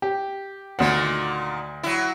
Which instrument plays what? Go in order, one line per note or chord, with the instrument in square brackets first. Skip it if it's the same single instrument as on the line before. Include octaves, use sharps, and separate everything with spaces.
[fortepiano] G4
[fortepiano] D2 F#5 [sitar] A#2 D#3
[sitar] F#3 E4